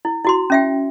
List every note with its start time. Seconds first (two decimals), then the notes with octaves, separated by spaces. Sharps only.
0.05 E4
0.24 E4 F#4 C6
0.50 C#4 E5 G5